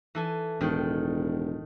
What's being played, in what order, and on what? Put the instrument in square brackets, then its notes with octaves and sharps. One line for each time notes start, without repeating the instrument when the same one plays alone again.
[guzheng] E3 A4 G#5
[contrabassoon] E1 [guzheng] A2 D#3 G5